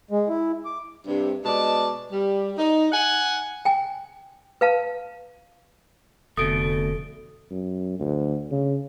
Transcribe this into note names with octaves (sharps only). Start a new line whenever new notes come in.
G#3
E4
D6
G2 C3
B2 G#3 D5 A5
G3
D#4
F#5 G#5
G5 G#5
B4 F5 A5
F1 D2 B2 A3 A4 D#6 D7
F#2
D2
C#3